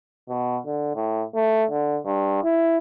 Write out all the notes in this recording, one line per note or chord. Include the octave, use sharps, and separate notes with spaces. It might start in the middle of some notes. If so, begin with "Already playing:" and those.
B2
D3
A2
A3
D3
G2
E4